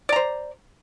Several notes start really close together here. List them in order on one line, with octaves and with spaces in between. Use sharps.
D5 A#5 C5